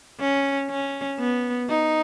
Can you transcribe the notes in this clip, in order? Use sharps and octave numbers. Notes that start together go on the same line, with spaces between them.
C#4
C#4
B3
D#4